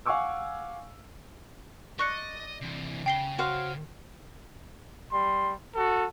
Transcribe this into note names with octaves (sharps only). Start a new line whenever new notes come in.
F5 F#5 G#5 C#6 D6 E6
D5 D#5 C#6 F#6 C#7
C3 E3
C#3 G5 C7 G7
F#4 C5 F5
G3 C6
F#4 A4